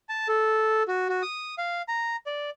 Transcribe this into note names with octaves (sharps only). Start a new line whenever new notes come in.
A5
A4
F#4
F#4
D#6
F5
A#5
D5